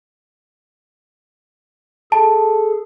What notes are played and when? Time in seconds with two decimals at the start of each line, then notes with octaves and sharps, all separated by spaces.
2.12 G#4 A4 A5